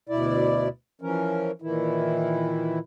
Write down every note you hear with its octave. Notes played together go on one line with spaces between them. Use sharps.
D2 B2 E4 D5
E3 F3 C#4 A#4
A#2 D#3 E3 E4